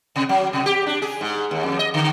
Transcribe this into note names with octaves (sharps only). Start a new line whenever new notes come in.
C3
F#3
C3
G4
D4
G#4
G#2
D#2
F2
D#5
D3